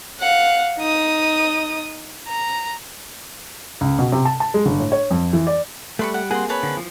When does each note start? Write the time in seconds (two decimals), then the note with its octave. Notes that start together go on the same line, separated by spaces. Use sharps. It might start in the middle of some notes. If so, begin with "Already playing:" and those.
0.20 F5 F#5
0.79 D#4 D#6
2.28 A#5
3.81 C#2
3.99 B2
4.12 C3
4.25 A5
4.40 A5
4.54 G#3
4.66 G1
4.79 A2
4.92 C#5
5.11 F2
5.33 E3
5.47 D5
5.99 G3 A3 B4 C6 C#6
6.14 F#5
6.31 A#3 C4 G#4 F#5 C6
6.49 B4 C#5 A5
6.63 D3
6.77 E3 F3